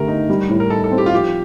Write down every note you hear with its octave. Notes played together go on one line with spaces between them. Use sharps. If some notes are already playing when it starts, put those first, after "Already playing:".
Already playing: D3 A3 G4 A#4
D#4
G3
A2
A#4
D#4 A4
A4
C4
G4
F4
F3 G4